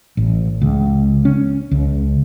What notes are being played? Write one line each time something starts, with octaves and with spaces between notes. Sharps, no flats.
A1
C#2
C#4
C#2